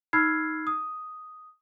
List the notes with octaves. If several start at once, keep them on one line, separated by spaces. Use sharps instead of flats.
D#4 B5 E6 F6 G#6 C7
D#6